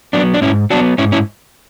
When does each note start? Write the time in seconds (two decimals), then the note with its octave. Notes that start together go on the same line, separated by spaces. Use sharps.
0.13 F#3 B3 D4
0.34 D4
0.41 G#2 C#4 E4
0.70 F#3 B3 D4 F#4
0.98 G#2 C#4 E4
1.12 C#4 E4